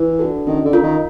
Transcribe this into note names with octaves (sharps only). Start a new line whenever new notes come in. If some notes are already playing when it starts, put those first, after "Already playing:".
Already playing: E3
D4 F#4 A4
D#3 C#4
D3
F4 A#4
D#3